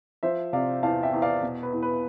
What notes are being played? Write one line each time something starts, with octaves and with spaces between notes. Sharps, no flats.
F3 C5 E5
C3 D5 F5
E2 F5 A5
E5 G5
E2
D5 F5
B2
B4
E2
B4